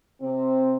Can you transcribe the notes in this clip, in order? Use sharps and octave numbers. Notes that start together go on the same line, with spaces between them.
C3 C4